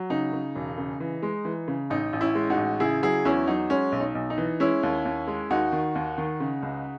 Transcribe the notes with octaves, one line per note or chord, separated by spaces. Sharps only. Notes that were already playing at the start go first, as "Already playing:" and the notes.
Already playing: F#3
C#3 D#4
C#3
E1
C#3
E3
G#3
E3
C#3
A1 D#4
A1
C#4 E4
G#3
D#4 F#4
A1
C#3 E4 G#4
F#3 E4 G#4
E2 C#4 E4
F#3 D#4
G#3 C#4
B1
D#4
B1
D#4
E3
G#3 C#4 E4
D#2
D#2
G#3
D#2 D#4 F#4
D#3
D#2
D#3
C#3
C#2